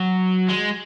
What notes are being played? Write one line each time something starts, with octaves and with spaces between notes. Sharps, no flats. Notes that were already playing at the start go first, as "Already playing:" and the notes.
Already playing: F#3
G#3